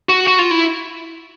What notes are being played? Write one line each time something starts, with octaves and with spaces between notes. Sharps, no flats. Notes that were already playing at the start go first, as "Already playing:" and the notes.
F#4
F#4
F4
E4